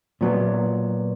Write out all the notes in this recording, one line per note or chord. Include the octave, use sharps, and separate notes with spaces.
A#2 F#3 B3